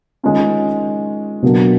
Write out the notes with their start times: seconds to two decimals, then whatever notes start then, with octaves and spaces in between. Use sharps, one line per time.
0.23 D#3 G#3 C#4 F4
1.42 B2 F#3 A#3 D4